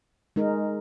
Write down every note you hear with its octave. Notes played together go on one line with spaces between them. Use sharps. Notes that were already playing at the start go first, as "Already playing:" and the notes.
G#3 D#4 A#4